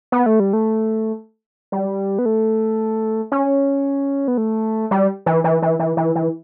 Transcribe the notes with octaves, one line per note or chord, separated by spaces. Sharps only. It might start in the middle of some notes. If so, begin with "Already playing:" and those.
B3
A3
G3
A3
G3
B3
A3
C#4
B3
A3
G3
E3
E3
E3
E3
E3
E3